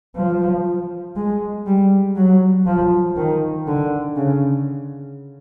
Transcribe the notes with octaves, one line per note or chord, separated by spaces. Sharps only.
F3
G#3
G3
F#3
F3
D#3
D3
C#3